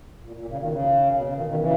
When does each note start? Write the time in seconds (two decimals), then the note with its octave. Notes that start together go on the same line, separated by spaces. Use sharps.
0.24 A#2
0.36 A#2
0.47 C#3
0.58 B2 D#3
0.69 C#3
1.13 B2
1.24 C#3
1.35 B2 D#3
1.46 B2 D#3
1.57 C#3 E3